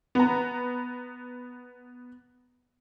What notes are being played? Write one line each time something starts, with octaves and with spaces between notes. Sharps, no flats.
B3 A#5